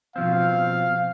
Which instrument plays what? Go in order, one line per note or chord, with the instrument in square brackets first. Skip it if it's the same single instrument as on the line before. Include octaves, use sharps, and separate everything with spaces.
[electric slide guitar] B2 F3 C4 [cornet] F5